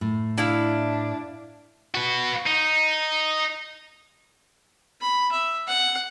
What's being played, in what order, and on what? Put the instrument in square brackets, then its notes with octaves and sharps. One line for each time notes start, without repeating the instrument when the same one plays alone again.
[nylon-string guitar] A2
[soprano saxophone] D4 [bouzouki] E4 F5
[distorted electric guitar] F#4 B4
D#4
[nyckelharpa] B5
E5
F#5